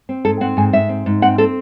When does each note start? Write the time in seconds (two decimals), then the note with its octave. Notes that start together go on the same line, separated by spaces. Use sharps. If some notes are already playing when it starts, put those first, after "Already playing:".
0.09 C4
0.25 G#2 A4
0.41 C4 F#5
0.57 G#2 G#5
0.73 G#2 E5
0.89 C4
1.06 G#2
1.22 C4 F#5
1.38 C4 A4